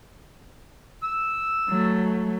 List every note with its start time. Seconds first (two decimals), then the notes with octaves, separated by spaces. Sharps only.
1.03 E6
1.69 F#3 A3